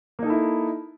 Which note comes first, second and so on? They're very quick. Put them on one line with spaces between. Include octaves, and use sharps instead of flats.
A#3 D#4 A4 E4